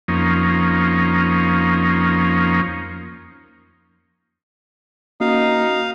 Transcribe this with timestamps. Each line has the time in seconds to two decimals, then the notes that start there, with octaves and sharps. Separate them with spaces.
0.08 F2 F3 A#3 C#4 D#4
5.21 A#3 C#4 D#4 F#4 F5